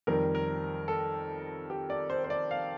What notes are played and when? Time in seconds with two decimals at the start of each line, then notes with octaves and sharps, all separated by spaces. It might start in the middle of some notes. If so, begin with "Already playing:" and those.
0.07 F2 D#3 G3 A#4
0.35 A#4
0.88 A4
1.70 G4
1.90 D5
2.10 C5
2.24 C5
2.30 D5
2.51 F5